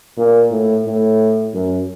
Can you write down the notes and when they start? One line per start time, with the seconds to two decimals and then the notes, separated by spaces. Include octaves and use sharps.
0.17 A#2
0.51 A2
0.85 A2
1.54 F#2